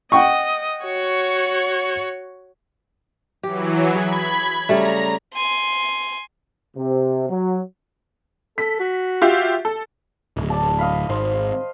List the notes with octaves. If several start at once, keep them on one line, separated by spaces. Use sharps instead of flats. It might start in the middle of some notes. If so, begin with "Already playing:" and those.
D#5 F#5 G5 C#6
F#4 C#5
E3 F#3 G4
G#4 B5 G#6
C#3 G3 A3 A#5
G#5 C6
C3
F#3
A4 B6
F#4
F4 G4 E5
A4
D1
D5 A5
D#5 F5 B5
G#1 C5